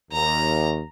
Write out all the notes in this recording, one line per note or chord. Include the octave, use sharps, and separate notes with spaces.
D#2 A#5